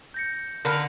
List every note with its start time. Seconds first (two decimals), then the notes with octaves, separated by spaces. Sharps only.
0.14 G6 A#6 C#7
0.65 D3 A#4 B4